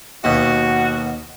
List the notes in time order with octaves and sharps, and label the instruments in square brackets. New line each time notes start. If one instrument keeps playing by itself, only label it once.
[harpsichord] D#2 B2 [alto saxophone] F#4